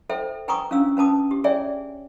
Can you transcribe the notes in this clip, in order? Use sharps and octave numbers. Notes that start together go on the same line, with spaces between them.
A4 C5 E5 G5
B4 G5 G#5 A#5 C#6 D#6
C#4 D4 F5 E6
C#4 B4 A5 D#6
G4
G#4 C#5 D5 E5 G5 G#5